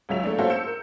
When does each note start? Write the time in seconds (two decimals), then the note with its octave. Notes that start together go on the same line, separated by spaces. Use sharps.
0.09 C#2 C#3 F#3 E5 F7
0.23 A3 A#3 D4
0.38 A#3 C#4 F#4 A4 C5 E5
0.50 E6 G6 C#7 E7
0.67 A#4